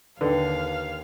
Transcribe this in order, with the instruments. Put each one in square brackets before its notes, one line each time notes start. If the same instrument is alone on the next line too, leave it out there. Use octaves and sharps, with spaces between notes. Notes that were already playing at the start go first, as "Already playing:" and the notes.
[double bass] D#2 [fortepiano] D3 [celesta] B4 G5 [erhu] F5